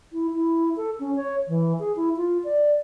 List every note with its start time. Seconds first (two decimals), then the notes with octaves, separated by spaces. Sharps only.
0.13 E4
0.34 E4
0.77 A4
1.00 C#4
1.16 C#5
1.48 E3
1.79 G#4
1.96 E4
2.17 F4
2.44 D5